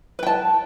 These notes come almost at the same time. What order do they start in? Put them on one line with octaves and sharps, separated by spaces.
B4 G5 A5